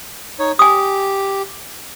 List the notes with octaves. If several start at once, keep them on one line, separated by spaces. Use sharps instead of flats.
D#4 C#5
G4 G#5 D#6